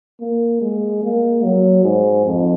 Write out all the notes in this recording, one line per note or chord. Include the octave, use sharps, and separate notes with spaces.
A#3
G#3
A#3
F#3
G#2
F2